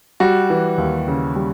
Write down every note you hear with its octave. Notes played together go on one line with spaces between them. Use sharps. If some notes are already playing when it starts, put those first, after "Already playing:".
G3 F#4
E3
D#2
C#3
G3